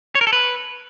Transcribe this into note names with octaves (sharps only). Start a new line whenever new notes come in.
C#5
A#4
A4
B4